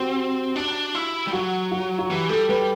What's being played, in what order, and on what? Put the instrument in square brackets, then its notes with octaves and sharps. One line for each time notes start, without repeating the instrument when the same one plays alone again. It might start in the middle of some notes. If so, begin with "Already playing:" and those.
Already playing: [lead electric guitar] C4 [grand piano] F#4 G4
[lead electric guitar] D4
E4
G3
[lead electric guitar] F#3 [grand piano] F#4
[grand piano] F#4
F#4
[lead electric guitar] E3 [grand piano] G4
[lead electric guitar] G3 [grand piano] A4
[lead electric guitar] G3 [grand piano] B4